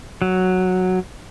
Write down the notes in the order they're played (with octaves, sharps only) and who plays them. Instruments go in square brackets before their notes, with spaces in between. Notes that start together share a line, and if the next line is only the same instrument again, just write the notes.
[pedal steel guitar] F#3